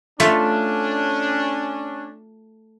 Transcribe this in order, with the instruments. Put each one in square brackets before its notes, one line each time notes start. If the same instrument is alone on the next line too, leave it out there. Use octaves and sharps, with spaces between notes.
[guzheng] A3 F4 E5 [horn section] C#4 D4